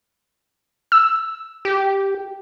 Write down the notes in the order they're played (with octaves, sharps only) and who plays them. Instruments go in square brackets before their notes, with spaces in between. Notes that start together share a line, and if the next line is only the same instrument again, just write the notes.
[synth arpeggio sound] E6
[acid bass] G4